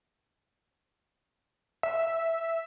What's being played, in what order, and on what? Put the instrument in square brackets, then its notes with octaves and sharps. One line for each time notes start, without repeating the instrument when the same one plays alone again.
[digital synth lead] E5